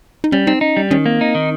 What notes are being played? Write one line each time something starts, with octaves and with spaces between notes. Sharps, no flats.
D#4
G3 C#4
C4 D#4
C#4 D#4
G3
D#3 C#4
A#3 C4
D#4
D#3